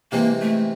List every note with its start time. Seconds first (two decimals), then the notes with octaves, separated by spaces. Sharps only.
0.12 C3 E3 G#3 A#3 C4
0.41 A3